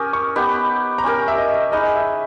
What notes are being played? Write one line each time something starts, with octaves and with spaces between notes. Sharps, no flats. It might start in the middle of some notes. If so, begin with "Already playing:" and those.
Already playing: C#4 G4 A#4 D#6
C#6
B3 D#4 G4 B4
A#5
C#4 G4 A#4 G#5
E5
D#5
D#4 G#4 B4 D#5
E5